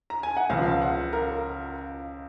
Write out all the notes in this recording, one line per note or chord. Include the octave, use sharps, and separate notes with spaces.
A#5
G#5
F#5
C#2 C#3 F3 F5
F5
F#5
A#4